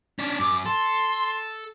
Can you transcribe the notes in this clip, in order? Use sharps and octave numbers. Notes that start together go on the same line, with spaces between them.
C#4 D4
F#2 D6
A4 C6